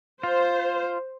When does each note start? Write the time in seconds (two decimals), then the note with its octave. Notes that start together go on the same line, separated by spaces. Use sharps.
0.23 F4 C5